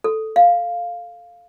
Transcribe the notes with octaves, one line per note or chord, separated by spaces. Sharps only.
A4
F5